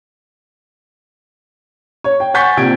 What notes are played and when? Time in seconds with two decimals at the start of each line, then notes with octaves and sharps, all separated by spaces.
2.04 C#5
2.20 G5
2.34 F#5 G#5 C#6 G6 A6 B6
2.57 A#1 C3 G#6 D7